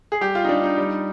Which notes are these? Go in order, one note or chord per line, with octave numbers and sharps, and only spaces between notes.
G#4
G3 G4
F4
D#4
G3 D4
D#4
G3